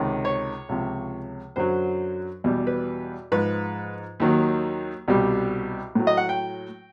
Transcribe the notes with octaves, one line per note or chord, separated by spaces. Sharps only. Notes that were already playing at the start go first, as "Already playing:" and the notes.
Already playing: C#2 C3 D#3
C#5
C#2 C3 F3
F#2 D3 F#3 C5
E2 B2 G3
B4
G#2 F3 B4
D#2 D#3 F#3
C2 B2 G3
A2 F#3
D#5
F#5
G5